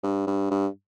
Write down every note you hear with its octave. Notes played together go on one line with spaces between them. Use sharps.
G2
G2
G2